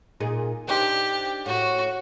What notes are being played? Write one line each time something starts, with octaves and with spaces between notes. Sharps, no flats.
A#2 D#4 G#4
D4 D#4 G4 C5
A2 F#4